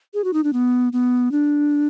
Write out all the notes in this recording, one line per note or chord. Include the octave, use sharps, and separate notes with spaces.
G#4
F#4
D#4
D4
B3
B3
D4